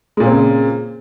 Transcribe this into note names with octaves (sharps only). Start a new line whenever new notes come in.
A#2 C#3 G#3 A#3 C4